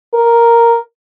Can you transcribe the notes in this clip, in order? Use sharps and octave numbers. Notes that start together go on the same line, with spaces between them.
A#4